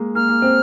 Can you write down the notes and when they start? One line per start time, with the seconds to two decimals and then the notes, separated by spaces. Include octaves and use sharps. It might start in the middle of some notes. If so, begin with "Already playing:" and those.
Already playing: G#3 A#3
0.15 A#3 F6
0.29 A#3
0.42 C4